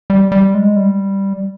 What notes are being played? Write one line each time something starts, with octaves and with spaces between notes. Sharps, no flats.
G3
G3
G#3
G3